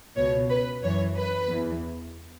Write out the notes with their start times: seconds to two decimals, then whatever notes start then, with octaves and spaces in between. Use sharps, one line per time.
0.17 C#2 B2 C#5
0.51 B4
0.84 F#2 E3 C#5
1.18 B4
1.50 E2 E3